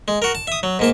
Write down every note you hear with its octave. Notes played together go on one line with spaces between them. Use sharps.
G#3
F#4 A#4
A5
E5 D#6
F#3
G#2 A#3 A5